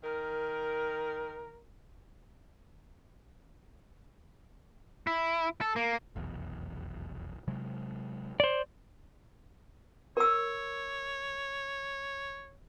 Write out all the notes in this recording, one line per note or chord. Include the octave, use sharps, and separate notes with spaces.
D#3 A#4
E4
A4
A#3
F1 B1 E2
C3 F#3 G#3
C5 D5
A#4 C#5 E6